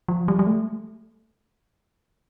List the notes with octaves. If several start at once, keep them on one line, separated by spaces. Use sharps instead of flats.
F3
G3
G3
A3